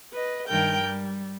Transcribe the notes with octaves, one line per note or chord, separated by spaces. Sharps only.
B4 D#5
G2 D#3 A#4 G5 G6
G3